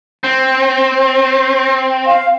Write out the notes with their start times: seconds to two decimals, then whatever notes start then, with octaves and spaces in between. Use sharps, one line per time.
0.24 C4
2.06 F5